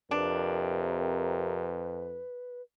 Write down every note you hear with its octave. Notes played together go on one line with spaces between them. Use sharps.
F2 C3 D4 A#4 B4